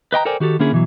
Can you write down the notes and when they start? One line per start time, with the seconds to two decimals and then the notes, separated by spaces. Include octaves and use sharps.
0.12 B4 D#5 G5 A#5
0.25 A4 A#4 C5 D5 G5 G#5
0.40 D#3 F#4 G4 A4
0.60 D3 A#3 C#4 E4 G#4
0.72 B2 E3 F#3